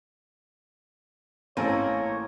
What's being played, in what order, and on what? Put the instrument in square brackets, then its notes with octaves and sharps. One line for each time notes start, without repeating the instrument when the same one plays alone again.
[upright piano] A1 [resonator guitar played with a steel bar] A#3 [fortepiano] C4 C#4 A4 [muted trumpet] C#5